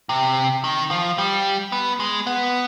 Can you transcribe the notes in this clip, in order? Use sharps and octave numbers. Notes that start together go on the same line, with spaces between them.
C3
D#3
F3
G3
B3
G#3
B3